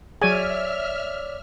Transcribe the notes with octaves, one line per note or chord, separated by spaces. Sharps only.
F#3 G#4 C#5 D5 E5 G#5 D6 F6